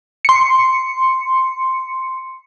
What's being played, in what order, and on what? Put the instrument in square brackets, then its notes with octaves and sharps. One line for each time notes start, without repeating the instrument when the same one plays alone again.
[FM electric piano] C6 C#7